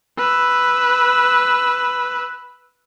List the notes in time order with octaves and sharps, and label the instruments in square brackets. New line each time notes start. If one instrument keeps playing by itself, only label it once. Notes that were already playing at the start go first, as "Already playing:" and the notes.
[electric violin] B4 E6